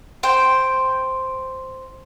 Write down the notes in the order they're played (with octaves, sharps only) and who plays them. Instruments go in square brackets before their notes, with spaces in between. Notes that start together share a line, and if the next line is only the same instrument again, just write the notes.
[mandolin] C5 G5